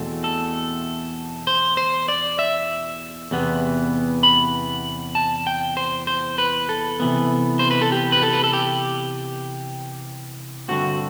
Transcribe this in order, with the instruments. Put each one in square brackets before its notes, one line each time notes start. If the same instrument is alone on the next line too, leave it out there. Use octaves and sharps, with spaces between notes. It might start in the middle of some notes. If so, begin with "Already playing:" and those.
Already playing: [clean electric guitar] E2 B2 A3 C4
A4
C5
C5
D5
E5
E2 C3 E3 B3
B5
A5
G5
C5
C5
B4
A4
C3 E3 B3
C5
B4
A4
G4
B4
A4
B4
A4
G4
G2 D3 A3 C4 F#4